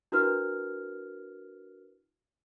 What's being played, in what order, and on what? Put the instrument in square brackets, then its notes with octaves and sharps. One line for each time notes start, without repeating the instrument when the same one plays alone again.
[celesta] D4 E4 F#4 A#4 B4 F6